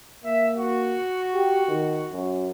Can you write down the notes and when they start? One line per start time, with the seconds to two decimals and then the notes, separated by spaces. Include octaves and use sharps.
0.24 A#3 E5
0.56 F#4
1.34 G4
1.68 D#3
2.12 F#2